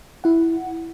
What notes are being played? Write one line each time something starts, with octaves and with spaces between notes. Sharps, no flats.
E4 F#5